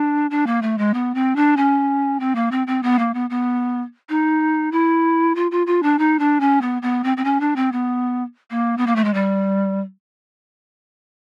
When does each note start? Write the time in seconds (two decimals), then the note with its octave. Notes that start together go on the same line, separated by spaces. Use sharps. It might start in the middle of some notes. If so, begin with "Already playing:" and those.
Already playing: D4
0.31 D4
0.47 A#3
0.62 A3
0.78 G#3
0.94 B3
1.15 C4
1.36 D4
1.57 C#4
2.20 C4
2.35 A#3
2.51 C4
2.67 C4
2.83 B3
2.99 A#3
3.14 B3
3.30 B3
4.09 D#4
4.72 E4
5.35 F4
5.51 F4
5.67 F4
5.83 D4
5.99 D#4
6.19 D4
6.40 C#4
6.61 B3
6.82 B3
7.04 C4
7.17 C4
7.24 C#4
7.40 D4
7.56 C4
7.72 B3
8.50 A#3
8.77 B3
8.87 A#3
8.96 A3
9.04 G#3
9.14 G3